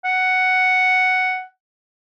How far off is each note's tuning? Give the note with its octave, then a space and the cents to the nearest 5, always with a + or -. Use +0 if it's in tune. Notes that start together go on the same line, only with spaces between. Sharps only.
F#5 +5